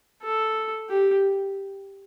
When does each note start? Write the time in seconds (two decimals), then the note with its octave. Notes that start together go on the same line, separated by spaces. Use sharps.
0.23 A4
0.89 G4